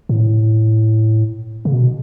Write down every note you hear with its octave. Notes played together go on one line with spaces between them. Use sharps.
A2
C#3
B2